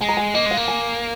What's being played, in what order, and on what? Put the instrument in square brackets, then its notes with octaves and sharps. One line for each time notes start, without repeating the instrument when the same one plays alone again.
[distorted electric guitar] G#3 [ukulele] G#5
[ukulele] A#5
G#5
[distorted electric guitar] A#3 [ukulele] D#5
[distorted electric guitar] G#3
[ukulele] F5
[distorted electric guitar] A#3
[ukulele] G#5